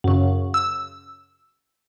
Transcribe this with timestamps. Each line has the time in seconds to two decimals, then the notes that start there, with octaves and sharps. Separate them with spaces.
0.04 F#2 C#3
0.54 E6